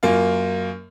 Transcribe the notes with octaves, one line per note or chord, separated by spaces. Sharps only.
F#2 A#3 F4